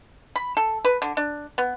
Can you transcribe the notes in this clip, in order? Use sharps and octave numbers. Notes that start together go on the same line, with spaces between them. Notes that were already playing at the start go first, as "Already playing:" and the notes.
B5
A4
B4
D3
D4
B3